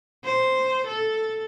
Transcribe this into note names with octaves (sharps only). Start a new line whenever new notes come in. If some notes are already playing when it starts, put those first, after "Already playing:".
C5
A4